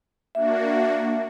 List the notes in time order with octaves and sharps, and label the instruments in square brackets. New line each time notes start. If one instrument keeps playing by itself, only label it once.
[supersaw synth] A#3 D4 F#4 [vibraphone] E5